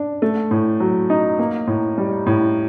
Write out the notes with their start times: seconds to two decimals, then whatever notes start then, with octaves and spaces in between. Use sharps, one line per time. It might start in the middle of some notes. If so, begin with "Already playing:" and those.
Already playing: D4
0.22 A3
0.51 A2
0.80 F#3
1.10 D#4
1.39 A#3
1.67 A2
1.98 G3
2.26 A2